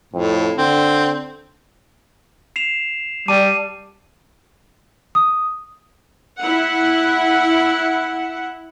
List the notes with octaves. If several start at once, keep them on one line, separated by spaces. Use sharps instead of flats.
F2 A2
D3 C4
C7 E7 F7
G3 A5 D6 D#7
D#6
E4 F#5